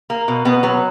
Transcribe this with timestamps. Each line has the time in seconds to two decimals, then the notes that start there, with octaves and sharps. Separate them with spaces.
0.10 A#3
0.28 B2
0.45 B2 B3
0.63 F#3 B3